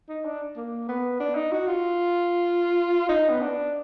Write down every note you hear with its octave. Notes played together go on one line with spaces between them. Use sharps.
D#4
D4
A#3
B3
D4
D#4
F#4
F4
D#4
B3
D4